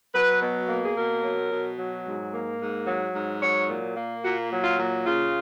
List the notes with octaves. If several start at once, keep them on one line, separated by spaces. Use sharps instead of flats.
F#3 B4
B2
A#3
G#4
B2 A#4
F#3
B2
F#3
G#2
A#3
G#2
F#3
G#2
F#3 C#5
A#2
A#3
A#2 F#4
F#3
F4
A#2
C#3 F4